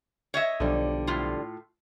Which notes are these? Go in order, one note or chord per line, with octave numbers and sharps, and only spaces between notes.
C#5 D#5 E5
B1 D3 F3 G3
A2 F4